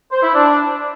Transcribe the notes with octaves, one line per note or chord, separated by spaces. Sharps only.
C5
E4
D4